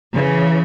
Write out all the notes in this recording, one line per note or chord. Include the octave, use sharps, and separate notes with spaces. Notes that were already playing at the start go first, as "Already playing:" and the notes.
C#3 E3